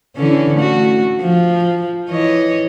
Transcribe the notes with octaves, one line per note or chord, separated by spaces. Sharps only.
D3 E3 C#4
A3 F#4
F3
E3 C#5 D#5